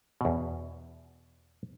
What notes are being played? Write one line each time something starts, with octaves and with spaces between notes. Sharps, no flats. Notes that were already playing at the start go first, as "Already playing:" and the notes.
E2 B2